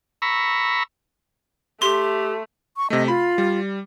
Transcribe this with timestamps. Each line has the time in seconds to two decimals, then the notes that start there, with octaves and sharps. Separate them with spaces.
0.22 A#5 B5 C#6 E6
1.82 A3 G4 C6
2.77 C#6
2.90 C3 A3 D#5
3.08 F4 B5
3.38 G3